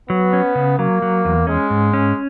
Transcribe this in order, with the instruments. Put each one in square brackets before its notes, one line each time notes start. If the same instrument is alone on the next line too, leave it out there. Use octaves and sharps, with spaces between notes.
[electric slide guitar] F#3 [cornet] B3
[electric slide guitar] C#4
C#3
[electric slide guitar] F#3 [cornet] A#3
[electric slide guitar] F#3
E2
[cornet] G#3 [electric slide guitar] C#4
[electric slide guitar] G#2
C#4